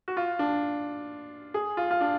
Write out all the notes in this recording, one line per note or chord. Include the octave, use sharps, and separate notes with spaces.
F#4
F4
D4
G#4
F4
F4
D4